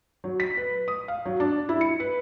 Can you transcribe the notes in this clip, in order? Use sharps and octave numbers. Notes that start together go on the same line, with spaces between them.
F#3
B6
B4
D#6
F5
F#3
D4
E4
C#7
B4